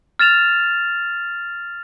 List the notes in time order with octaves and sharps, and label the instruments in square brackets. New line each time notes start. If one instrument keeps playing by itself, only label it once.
[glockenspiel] F6 A6 E7 F7